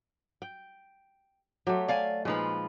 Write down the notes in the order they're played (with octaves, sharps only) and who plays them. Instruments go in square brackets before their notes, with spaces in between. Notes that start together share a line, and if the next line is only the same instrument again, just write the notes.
[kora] G5
[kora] F#3 A3 [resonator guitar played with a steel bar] G4
[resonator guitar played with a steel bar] D5 F5 G#5
[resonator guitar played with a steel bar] A#2 F3 B4 [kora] G#3 D#4